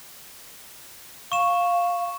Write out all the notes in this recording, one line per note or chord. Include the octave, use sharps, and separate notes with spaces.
F5 C#6 E7